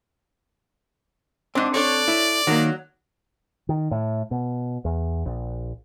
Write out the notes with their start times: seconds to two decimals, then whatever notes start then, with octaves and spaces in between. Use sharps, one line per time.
1.55 G#2 C4 D4
1.74 D4 A4 C#5 D5
2.08 E4
2.47 D#3 F#3 A#3
3.69 D#3
3.91 A2
4.31 B2
4.85 E2
5.26 A#1